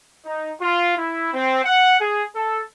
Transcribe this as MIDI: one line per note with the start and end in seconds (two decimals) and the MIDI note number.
0.24 0.50 63
0.60 0.95 65
0.97 1.31 64
1.33 1.60 60
1.64 1.95 78
1.99 2.23 68
2.34 2.60 69